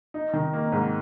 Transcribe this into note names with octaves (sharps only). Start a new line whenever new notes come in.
D#4
D#3
A#3
G#2